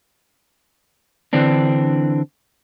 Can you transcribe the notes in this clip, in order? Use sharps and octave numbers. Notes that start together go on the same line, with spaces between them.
D3 E3 C4 D4